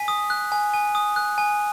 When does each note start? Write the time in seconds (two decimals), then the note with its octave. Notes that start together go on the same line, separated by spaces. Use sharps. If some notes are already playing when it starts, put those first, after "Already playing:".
Already playing: G#5 B6
0.08 D#6
0.30 F#6
0.52 G#5
0.73 G#5
0.95 D#6
1.16 F#6
1.38 G#5